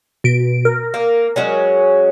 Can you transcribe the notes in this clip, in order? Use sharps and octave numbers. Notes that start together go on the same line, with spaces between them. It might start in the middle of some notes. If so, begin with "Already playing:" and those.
B2 D7
A#4
A#3
F#3 G#3 C#4